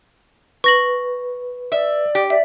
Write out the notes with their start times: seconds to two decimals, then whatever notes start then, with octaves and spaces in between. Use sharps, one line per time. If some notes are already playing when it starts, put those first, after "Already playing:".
0.64 B4 C#6 A#6 F#7
1.72 D5 E5
2.15 G4
2.30 D5 E5